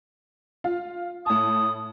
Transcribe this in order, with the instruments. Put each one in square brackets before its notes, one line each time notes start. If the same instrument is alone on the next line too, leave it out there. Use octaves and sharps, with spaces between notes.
[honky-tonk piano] F4 F5
[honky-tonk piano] A2 A5 [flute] D#6